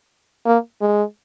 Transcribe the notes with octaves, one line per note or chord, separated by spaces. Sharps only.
A#3
G#3